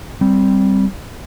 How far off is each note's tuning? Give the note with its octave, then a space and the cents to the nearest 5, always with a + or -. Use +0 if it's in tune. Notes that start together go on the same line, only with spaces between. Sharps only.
G3 -5 C4 +0